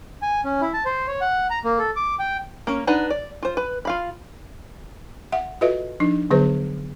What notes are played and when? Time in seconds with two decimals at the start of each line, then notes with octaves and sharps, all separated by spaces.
0.22 G#5
0.44 C#4
0.61 E4
0.73 A5
0.85 C5
1.07 C#5
1.21 F#5
1.50 A#5
1.64 A#3
1.79 A4
1.96 D6
2.19 G5
2.67 A#3 C#4
2.87 D4 D#4 B4 F#5
3.10 D5
3.43 F4 C5
3.57 B4
3.85 F4 F5 B5
5.32 E5 F#5
5.61 F4 F#4 A4 B4 D#5 E5
6.00 F3 D4 D#4
6.31 D3 F#3 B3 G#4 B4 C5